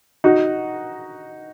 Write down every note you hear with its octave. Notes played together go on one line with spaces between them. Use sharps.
D#4 F#4